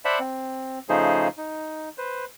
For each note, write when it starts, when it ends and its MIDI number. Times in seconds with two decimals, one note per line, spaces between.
0.05 0.19 72
0.05 0.19 74
0.05 0.19 76
0.05 0.19 78
0.05 0.19 81
0.05 0.19 83
0.20 0.79 60
0.89 1.28 49
0.89 1.28 53
0.89 1.28 57
0.89 1.28 63
0.89 1.28 68
0.89 1.28 72
1.37 1.89 63
1.98 2.25 71
1.98 2.25 72